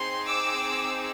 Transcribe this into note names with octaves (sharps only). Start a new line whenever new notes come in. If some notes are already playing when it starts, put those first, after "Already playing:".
Already playing: C4 D#4 G#4 C6
D6 E6